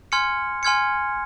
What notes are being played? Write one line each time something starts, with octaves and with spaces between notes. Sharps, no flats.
G#5 C6 F6 G#6 C#7
G#5 C6 F6 G#6 C#7